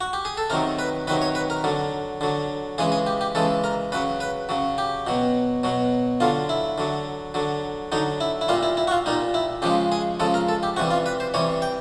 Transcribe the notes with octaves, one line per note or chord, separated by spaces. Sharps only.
F#4
G4
G#4
A4
C3 D#3 F#3 A#4
B4
C3 D#3 F#3 B4
C#5
B4
A#4
D3 F#3
D3 F#3
C#3 E3 G#3 G#4
G#4
G4
G4
C#3 E3 G#3 A4
A#4
C#3 F#3 B4
B4
C#3 F#3
G4
B2 F#3
B2 F#3
D3 F#3 F4
E4
D3 F#3
D3 F#3
D3 F#3 D#4
E4
E4
A#2 G3 F4
E4
E4
F#4
F4
A#2 G3 D#4
E4
C#3 F3 G#3 G4
G#4
C#3 F3 G#3 A4
A#4
A4
G4
C3 E3 G3 F#4
F4
B4
C5
C3 E3 G3 C#5
G5